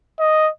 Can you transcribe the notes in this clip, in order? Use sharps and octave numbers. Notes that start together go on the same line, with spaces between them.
D#5